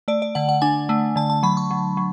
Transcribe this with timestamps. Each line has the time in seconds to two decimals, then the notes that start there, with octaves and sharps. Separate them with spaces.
0.08 A3 D5
0.22 D5
0.35 D3 F#5
0.49 F#5
0.62 D4 G#5
0.89 A3
1.16 D3 A5
1.30 A5
1.43 F#3 B5
1.57 C#6
1.71 F#3
1.97 F#3